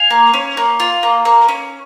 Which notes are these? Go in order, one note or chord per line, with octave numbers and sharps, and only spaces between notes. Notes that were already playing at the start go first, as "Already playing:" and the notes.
Already playing: F5 G#5
A#3
C#4
A#3
F4
A#3
A#3
C#4